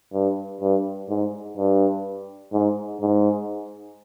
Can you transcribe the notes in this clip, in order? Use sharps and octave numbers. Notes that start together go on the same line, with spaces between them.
G2
G2
G#2
G2
G#2
G#2